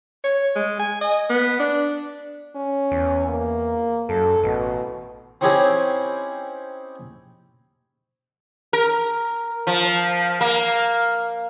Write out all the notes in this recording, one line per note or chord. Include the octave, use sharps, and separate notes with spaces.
C#5
G#3
G#5
D#5
B3
D4
C#4
E2
A#3
F#2 A4
A1 B2
C4 C#4 D#4 E4 G4 G#4
A#4
F3
A#3